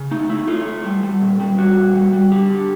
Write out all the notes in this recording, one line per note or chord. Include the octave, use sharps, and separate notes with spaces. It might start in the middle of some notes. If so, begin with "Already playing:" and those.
Already playing: C#3
A3 D#4
A3 E4
A3 F4
A3
G3
G3
A#2
G3
G3 F#4
A#2
G3
G3
D3 G4
D3